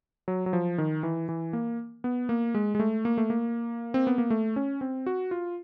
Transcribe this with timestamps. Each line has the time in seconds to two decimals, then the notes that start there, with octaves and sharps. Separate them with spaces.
0.28 F#3
0.46 F#3
0.53 F3
0.78 D#3
1.03 E3
1.29 E3
1.53 A#3
2.04 B3
2.29 A#3
2.54 G#3
2.75 G#3
2.79 A3
3.05 A#3
3.18 A3
3.30 A#3
3.94 C4
4.07 B3
4.18 A#3
4.30 A3
4.56 C#4
4.81 C4
5.06 F#4
5.31 F4